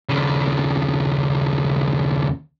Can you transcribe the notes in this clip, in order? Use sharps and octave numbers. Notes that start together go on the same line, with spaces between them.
D#2 C#3